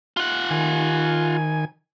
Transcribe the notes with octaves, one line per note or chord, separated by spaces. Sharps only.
F4 F#5
D#3 G#5